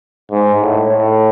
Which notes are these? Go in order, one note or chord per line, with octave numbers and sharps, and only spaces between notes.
G#2
A2
A2